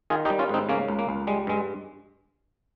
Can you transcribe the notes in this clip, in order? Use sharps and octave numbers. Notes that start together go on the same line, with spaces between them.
D#3 F4 G#4
D#4 G4
G3
C#4 F4
G#2 C4 D#4
C#3 A#3 C#4
C#2
A#3
C#2
G3 G#3
G2 G#3